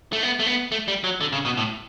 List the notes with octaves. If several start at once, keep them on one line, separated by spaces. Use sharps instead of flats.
A3
B3
A3
B3
A3
G3
F#3
D3
C#3
B2
A2